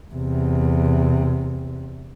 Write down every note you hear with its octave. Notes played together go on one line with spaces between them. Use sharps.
E2 C3